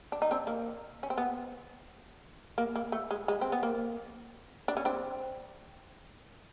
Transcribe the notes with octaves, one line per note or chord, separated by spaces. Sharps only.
D4
D#4
C4 D4
A#3
C#4
C4
B3
A#3
A#3
A3
G#3
G#3
C4
B3
A#3
D4
C#4
C4 D4